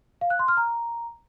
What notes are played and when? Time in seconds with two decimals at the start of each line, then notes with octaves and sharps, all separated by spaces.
0.21 F5
0.30 F#6
0.39 C6
0.48 F6
0.57 A#5